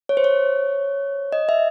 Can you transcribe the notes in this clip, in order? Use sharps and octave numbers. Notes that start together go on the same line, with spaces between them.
C#5
C5
C#5
D#5
E5